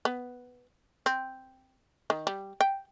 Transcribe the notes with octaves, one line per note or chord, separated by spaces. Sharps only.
B3
C4
D#3
G3
G5